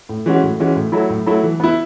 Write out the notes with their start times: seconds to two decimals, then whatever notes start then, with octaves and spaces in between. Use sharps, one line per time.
0.09 A2
0.26 E3 G#3 C#4 F#4
0.43 A2
0.60 E3 G#3 C#4 F#4
0.76 A2
0.92 F#3 A3 E4
1.09 A2
1.26 F#3 A3 E4
1.43 E3
1.60 B3 E4